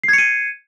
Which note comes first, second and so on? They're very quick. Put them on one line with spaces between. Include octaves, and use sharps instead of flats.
C7 G#6 C#7 D#7